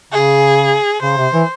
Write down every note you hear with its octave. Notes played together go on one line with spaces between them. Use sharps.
C#3 G#4
C#3 C5
C3
E3